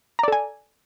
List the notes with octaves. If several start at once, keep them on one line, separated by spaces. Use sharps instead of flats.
A4 D5 G#5 A#5